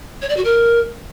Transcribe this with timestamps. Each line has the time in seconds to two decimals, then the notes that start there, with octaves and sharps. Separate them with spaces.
0.22 C#5
0.29 D5
0.37 F#4
0.44 A#4